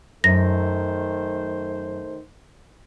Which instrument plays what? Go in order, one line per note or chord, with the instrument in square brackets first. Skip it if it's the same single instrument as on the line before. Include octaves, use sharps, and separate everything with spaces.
[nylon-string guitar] F#2 [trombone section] D#3 A3 C5 [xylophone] A#6